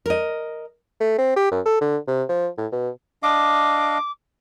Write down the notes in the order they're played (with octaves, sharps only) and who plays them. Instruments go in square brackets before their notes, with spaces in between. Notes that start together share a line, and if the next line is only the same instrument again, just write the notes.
[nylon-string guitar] A#4 D#5
[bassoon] A3
C4
G4
F#2
A4
D3
C3
F3
A2
B2
[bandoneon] D4 D#5 F5 [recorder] D6